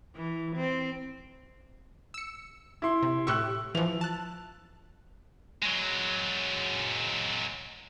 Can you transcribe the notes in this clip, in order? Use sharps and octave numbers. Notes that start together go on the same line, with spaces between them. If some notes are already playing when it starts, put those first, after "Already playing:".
E3
C4
E6 C#7
E4 C6
C3
A2 G4 C#6 E6 F#6
E3 F3 F7
A5 F#6
F#3 G#3